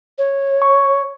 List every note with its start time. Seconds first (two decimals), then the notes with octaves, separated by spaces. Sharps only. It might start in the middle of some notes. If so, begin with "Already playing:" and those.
0.18 C#5
0.62 C#6